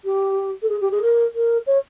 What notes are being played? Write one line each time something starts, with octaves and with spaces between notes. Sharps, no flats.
G4
A4
G#4
G4
G#4
A#4
A#4
C#5